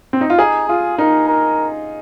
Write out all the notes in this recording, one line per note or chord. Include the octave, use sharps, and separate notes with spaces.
C4
D#4
F4
D#4 G#4
F4 G#4
D#4 A#4
A#4